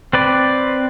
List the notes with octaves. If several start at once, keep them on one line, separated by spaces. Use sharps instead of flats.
C4 B4 D5